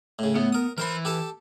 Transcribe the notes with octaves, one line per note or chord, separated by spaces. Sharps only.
A2 C#3
A2 B3
A#4 D#6
E3 A#4 C5 B5 C6
G4 A4 A5